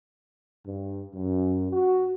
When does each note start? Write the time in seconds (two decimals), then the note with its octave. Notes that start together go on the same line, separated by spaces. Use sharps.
0.66 G2
1.14 F#2
1.73 F#4